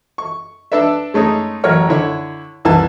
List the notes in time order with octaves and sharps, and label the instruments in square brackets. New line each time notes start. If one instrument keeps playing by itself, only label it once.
[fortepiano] C#6
D4 A4 B4 D5 E5
G#3 A3 C#4 D#4
A1 F#3 A#4 C#5 F6
D3 E4 C#5
C2 E3 B4 A5